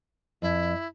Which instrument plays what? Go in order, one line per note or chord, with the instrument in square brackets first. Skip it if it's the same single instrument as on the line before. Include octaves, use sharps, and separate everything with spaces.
[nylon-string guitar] F2 [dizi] E4